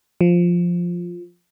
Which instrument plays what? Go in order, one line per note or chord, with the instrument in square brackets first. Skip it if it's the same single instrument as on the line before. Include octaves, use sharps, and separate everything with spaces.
[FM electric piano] F3